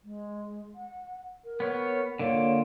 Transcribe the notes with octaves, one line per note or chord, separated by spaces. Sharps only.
G#3
F#5
A#4
B3 C#5
D3 A#3 F4 C#5